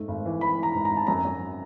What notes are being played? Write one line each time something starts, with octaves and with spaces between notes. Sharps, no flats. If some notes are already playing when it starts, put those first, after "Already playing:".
Already playing: G#2 A3
G#1
E3
E3 B5
E3
A#5
G#2
A#5
G#1
A5
F#2 A#5
F#2